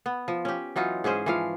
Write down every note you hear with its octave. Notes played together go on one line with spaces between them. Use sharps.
B3
F3
C#4 G4
E3 F#3 D#4 F4
G#2 C#4 G#4 C5
E3 F3 F5